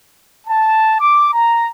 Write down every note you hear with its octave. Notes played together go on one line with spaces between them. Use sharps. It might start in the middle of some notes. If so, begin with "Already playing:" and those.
A5
D6
A#5